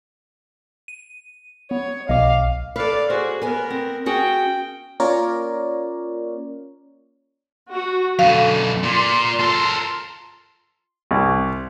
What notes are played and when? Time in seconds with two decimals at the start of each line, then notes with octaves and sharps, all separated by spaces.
0.88 D#7
1.71 B3 C#5
2.09 B1 D#5 F5 D6
2.76 A4 B4 D5 F5
3.10 F#4 G#4 C5
3.42 B3 A#4 B4 G#5
3.70 C4
4.06 C#4 F#4 G#4 G5
5.00 A#3 C#4 F4 A#4 C#5 D5
7.71 F#4
8.19 F#2 B2 D3 F5
8.84 A#2 F4 C6
9.40 A4 A#4
11.11 C2